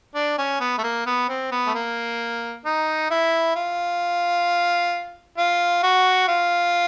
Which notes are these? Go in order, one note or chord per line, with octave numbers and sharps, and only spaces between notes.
D4
C#4
B3
A3
A#3
B3
C4
B3
A3
A#3
D#4
E4
F4
F4
F#4
F4